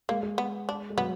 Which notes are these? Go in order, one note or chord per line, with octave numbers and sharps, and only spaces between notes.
G#3 A#3
G#3
B3
D4
G#3
F#3 B3